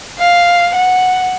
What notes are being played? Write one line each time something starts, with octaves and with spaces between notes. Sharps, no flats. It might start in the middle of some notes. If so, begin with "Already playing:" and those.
F5
F#5